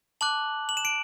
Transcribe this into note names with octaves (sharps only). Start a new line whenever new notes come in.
A5 D6 F#6 F#7
F#7
E7
D7